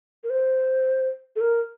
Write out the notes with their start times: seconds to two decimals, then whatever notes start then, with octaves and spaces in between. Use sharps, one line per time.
0.24 A#4
0.30 C5
1.36 A4
1.41 A#4